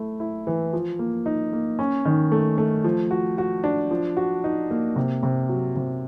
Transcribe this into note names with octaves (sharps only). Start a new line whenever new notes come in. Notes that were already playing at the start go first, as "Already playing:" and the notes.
Already playing: A3 E4
E4
E3
F3
A#3
D#4
A#3
C#4
D#3
A3
A3
F3
F#4
F#4
D4
F3
F#4
D#4
A#3
C3
C3
F#3
C3